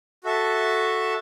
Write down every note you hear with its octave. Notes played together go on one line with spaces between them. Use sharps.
F#4 A4 E5 A5